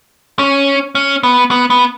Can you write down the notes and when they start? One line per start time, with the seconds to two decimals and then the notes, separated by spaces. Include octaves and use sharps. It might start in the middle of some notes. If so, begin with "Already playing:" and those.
0.39 C#4
0.95 C#4
1.23 B3
1.51 B3
1.70 B3